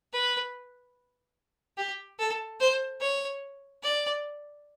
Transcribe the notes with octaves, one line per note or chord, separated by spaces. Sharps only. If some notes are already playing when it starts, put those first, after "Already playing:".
B4
G4
A4
C5
C#5
D5